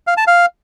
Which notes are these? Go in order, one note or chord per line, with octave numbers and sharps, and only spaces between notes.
F5
A5
F5